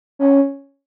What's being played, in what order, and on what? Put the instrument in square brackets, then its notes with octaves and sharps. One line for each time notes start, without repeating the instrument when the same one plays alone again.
[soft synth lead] C#4